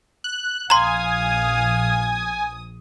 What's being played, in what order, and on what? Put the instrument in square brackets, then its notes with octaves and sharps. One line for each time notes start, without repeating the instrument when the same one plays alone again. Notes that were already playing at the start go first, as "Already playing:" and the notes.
[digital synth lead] F#6
[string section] A#1 D#6 [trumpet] F5 [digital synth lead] G#5 [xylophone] A#5 C6